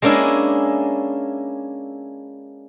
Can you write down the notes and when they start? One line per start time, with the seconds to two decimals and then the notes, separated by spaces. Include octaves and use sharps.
0.02 G#3 A#3 C#4 D4 E4